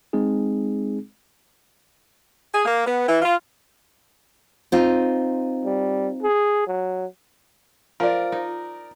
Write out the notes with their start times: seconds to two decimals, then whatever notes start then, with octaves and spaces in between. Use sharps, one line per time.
0.13 G#3 C4 D#4 G#4
2.54 G#4
2.65 A#3
2.87 B3
3.09 E3
3.22 F4
4.72 C4 D#4 F4
5.65 G3
6.23 G#4
6.67 F#3
8.00 F3 A#4 D5
8.32 D#4